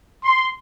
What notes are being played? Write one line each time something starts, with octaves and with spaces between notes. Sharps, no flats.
C6